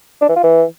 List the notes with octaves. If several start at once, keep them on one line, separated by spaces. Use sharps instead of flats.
D4
E3
F4
E3